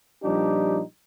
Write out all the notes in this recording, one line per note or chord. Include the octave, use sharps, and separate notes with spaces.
A#2 F3 G3 D4 D#4 G4